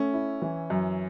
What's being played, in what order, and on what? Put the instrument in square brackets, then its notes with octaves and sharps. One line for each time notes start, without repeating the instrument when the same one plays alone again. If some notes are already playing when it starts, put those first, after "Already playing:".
Already playing: [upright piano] A3 [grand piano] C#4
[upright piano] E4
E3
F#2